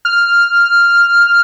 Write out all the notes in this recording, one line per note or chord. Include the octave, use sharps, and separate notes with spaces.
F6